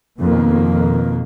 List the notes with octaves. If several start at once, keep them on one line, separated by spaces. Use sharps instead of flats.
F2 B2 D#3 A#3